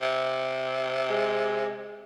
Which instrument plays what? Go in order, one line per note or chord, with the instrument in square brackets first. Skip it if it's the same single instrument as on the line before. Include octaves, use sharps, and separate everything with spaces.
[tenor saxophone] C3
[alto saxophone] G#3